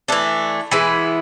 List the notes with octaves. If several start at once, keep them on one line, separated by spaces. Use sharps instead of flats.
E3 A3 D4
E3 G#3 B3 E4